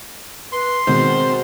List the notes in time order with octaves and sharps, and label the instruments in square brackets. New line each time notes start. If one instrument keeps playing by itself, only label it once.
[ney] B4 [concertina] C6
[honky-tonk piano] B2 D#3 G#3 [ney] C4 [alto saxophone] C5